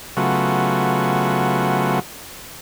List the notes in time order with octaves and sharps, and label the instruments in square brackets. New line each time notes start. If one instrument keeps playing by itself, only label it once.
[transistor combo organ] C#3 F#3 A3 B3 F4 F#4